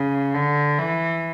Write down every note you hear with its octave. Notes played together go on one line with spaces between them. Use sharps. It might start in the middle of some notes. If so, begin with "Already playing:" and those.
Already playing: C#3
D3
E3